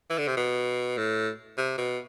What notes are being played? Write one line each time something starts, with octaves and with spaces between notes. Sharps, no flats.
E3
D3
C3
B2
A2
C3
B2